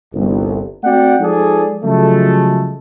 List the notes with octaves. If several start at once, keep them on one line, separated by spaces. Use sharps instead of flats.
G1 C2
A3 C4 F#4 D5 F#5 G5
F3 G#3 D#4 G#4 A4 D5
C#3 F3 F#3 G#3 A3